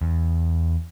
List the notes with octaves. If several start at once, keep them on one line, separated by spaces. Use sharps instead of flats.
E2